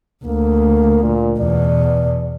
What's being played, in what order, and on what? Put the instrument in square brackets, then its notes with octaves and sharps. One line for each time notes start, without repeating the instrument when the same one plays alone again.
[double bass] D2 [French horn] A#3
[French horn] A#2
[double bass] E2 B2 [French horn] D5